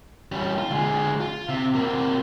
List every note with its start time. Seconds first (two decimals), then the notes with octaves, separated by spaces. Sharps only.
0.32 G3 C#4
0.58 F4
0.70 D3 G#3
1.20 F4
1.49 C3
1.75 C3 A#3